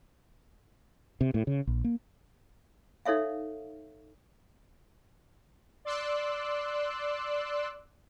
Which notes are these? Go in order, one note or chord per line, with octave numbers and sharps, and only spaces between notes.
C3
A2
C#3
A#1
A#3
D#4 A4 C#5 E5 F5
D5 C6 D6 E6 F#6